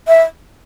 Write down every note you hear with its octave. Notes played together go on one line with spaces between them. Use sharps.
E5